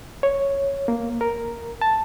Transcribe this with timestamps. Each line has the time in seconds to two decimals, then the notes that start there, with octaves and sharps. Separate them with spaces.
0.23 C#5
0.88 A#3
1.21 A#4
1.81 A5